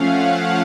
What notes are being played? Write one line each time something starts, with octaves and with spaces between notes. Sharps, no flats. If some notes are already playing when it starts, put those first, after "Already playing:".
Already playing: F3 A3 C#4 F5 F#5
F5